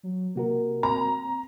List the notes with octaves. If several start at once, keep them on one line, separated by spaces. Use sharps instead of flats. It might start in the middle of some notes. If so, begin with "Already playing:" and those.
F#3
C3 A#3 F#4 A#4
C4 A#5